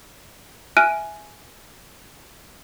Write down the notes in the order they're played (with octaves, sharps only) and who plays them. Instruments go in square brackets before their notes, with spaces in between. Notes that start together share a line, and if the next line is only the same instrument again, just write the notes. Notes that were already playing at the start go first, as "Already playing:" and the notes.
[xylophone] E5 G#5 F6 F#6 D7 D#7